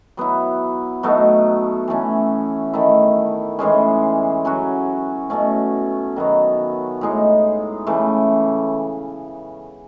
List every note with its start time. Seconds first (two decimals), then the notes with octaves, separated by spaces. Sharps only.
0.17 F#3 B3 E4
1.03 B2 F#3 A3 D#4
1.88 E3 A3 C#4
2.73 D#3 A3 E4
3.59 A2 E3 G#3 C#4
4.45 F#3 C#4 F#4
5.30 B2 A3 C#4
6.16 D#3 F#3 B3
7.01 A2 G#3 D#4
7.87 C#3 E3 A3